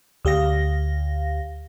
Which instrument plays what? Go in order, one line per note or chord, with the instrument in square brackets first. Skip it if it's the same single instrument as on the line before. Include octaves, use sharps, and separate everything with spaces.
[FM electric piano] D2 G4 F5 A#6